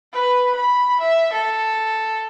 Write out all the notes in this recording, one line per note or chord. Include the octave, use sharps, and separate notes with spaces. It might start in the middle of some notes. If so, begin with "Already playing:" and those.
B4
B5
E5
A4